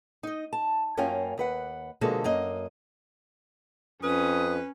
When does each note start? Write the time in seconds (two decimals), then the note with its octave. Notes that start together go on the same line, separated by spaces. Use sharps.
0.23 D#4 D#5
0.53 A5
0.97 F#2 A#3 C#4 F4 G5 G#5
1.38 D#2 B4 F#5
2.01 B2 D3 F3 G#3 A#3 A4
2.24 F#2 A#3 D#5
4.03 F2 C#4 B4 D#6